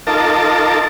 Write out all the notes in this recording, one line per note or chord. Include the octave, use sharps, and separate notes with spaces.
D#4 F4 A4 A#4 A5 D6